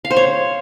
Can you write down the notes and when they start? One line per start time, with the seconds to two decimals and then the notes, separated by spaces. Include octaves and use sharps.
0.05 F5
0.11 C5
0.17 C#5